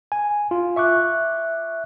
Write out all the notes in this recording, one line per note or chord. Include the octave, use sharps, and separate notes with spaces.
G#5
F4
E5 C#6 D6 F#6